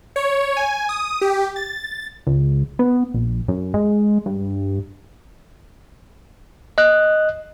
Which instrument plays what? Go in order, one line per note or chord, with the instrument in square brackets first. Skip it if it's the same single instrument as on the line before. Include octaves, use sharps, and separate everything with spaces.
[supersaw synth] C#5
G#5
D#6
G4
A6
[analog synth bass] C#2
B3
A#1
F#2
G#3
G2
[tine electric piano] D#5 F#6